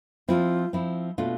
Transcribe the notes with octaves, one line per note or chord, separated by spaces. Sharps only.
F3 C4 E4 F4
F3 C4 E4
B2 A3 D4 F4